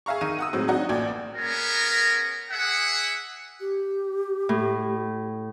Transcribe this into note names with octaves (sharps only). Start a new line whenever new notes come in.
G#4 E5 F5 A#5 C#6
D#3 D#4 D#7
F#5 D#6 E6
A2 F#3 G#3 C4 D#4
F#3 D4 D#4 F#4 D#5
A1 A#2 D5 G5 G#6
B3 C#4 G#4 A#4
G#4 E5 F#5
G4
A2